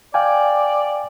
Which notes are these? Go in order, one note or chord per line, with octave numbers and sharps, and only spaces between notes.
D5 F5 G5 G#5